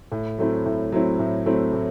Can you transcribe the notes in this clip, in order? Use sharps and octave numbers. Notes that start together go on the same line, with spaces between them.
A2
F#3 A3 C4 E4
A2
F#3 A3 C4 E4
A2
F#3 A3 C4 E4
A2